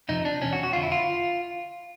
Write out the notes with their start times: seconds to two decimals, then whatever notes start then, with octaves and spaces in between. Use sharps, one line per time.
0.09 F2 C3 F3 D#4
0.25 D4
0.41 E2 B2 C#4
0.53 F#4
0.63 F#4
0.73 F2 D3 F3 F4
0.83 E4
0.92 F4